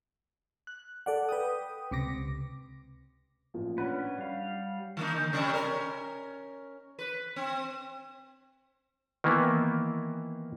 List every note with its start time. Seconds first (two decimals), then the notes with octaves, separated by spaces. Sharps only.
0.67 F#6
1.06 A4 D5 F#5
1.29 B4 G5 D#6
1.91 C#2 C3 D6 A#6
3.54 A1 A#2 F3
3.78 C#4 D4 B4 C#5 F#5
4.18 G3 F5
4.97 D#3 A#3 D#4
5.16 D3
5.33 C3 G3 C#4
5.53 C#4 A#4
6.99 B4
7.36 C4
9.24 D#3 E3 A#3 B3